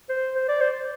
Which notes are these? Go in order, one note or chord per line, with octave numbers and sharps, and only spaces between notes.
C5
C5
D5
C5